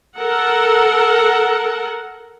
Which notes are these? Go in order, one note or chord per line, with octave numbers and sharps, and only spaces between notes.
A4 A#4 F#5